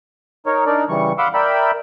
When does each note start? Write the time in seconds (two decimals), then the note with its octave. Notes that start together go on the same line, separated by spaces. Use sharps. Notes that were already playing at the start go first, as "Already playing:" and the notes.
0.46 D#4 A#4 C#5
0.66 D4 D#4 A#4 D5
0.89 C#3 E3 G3 C#6
1.18 F5 F#5 B5 C6 D6 E6
1.34 A#4 D5 E5 G5 B5